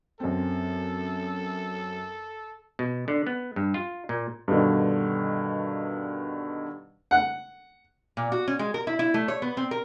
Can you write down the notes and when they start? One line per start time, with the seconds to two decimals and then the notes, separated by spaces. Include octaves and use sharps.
0.20 F#2 C4 A4
2.79 B2
3.08 D3
3.27 B3
3.56 G2
3.74 F4
4.09 A#2
4.48 G2 B2 D3 D#3
7.11 F#5
8.17 A#2
8.32 F#4
8.48 C#4
8.59 G#3
8.74 A#4
8.87 E4
8.99 E4
9.14 A3
9.28 C#5
9.42 B3
9.57 C4
9.71 A#4